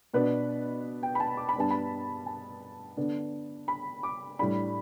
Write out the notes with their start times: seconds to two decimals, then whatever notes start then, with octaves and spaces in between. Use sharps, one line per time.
0.14 B2 B3 D4 B4
1.03 G5
1.15 B5
1.20 A5
1.37 D6
1.49 B5
1.56 G2 G3 B3 D4 A5
1.71 B5
2.26 A5
2.97 D3 B3 D4
3.68 B5
4.03 D6
4.39 A2 G3 D4 B5